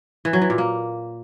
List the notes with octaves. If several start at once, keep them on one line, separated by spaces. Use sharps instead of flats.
E3
F#3
E3
A#2
A#3